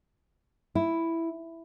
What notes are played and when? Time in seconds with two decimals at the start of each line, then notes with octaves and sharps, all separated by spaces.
0.75 E4